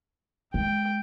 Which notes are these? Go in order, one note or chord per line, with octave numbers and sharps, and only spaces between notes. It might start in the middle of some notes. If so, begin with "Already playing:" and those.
G#3 G5